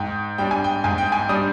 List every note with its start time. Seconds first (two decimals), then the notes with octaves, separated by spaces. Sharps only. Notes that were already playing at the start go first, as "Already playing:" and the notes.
Already playing: G#2 G5
0.38 G3 D4 G5
0.51 G#5
0.64 G5
0.84 G#2 G#5
0.98 G5
1.12 G#5
1.29 G3 D4 D#6